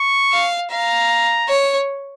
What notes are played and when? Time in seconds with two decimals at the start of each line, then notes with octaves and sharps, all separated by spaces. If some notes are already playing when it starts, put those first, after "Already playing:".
Already playing: C#6
0.32 F5
0.71 F5 A#5
1.49 C#5